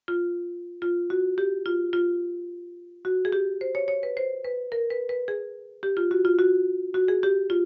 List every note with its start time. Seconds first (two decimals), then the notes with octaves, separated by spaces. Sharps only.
0.08 F4
0.82 F4
1.10 F#4
1.38 G4
1.66 F4
1.93 F4
3.05 F#4
3.25 G#4
3.32 G4
3.61 C5
3.75 C#5
3.88 C#5
4.03 B4
4.17 C5
4.44 B4
4.72 A#4
4.90 B4
5.09 B4
5.28 G#4
5.83 G4
5.97 F4
6.11 F#4
6.25 F4
6.39 F#4
6.94 F#4
7.08 G#4
7.23 G4
7.50 F4